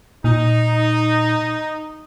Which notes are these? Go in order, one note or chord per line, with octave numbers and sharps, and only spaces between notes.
A#2 D#4